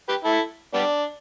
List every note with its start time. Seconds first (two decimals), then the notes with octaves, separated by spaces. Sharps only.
0.09 G4 B4
0.25 E4 A4
0.74 G3 B3 D4